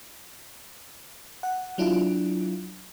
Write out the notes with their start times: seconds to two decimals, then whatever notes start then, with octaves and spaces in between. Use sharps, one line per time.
1.43 F#5
1.78 F#3 D4 E4 F4